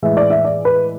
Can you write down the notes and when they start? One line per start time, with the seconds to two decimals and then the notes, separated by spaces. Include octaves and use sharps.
0.02 A2 E3 G#3 E5
0.17 D5
0.30 E5
0.45 D5
0.65 B4